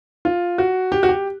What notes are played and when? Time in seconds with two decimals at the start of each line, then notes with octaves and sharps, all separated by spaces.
0.25 F4
0.58 F#4
0.92 G4
1.03 F#4
1.09 G4